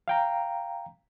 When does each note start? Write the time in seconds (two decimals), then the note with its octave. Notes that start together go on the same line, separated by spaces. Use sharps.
0.08 F5 G5 A#5